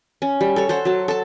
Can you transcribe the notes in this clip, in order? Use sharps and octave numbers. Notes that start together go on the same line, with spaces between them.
C#4
G3
A4 C#5
A4 C5 F#5
F#3 A5
A4 A5